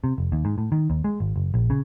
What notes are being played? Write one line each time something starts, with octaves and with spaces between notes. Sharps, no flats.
C3
F1
D#2
G#2
A2
D#3
D#2
G#3
G#1
F#1
A#1
C#3